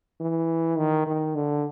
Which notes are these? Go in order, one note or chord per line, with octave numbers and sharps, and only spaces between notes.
E3
D#3
D#3
D3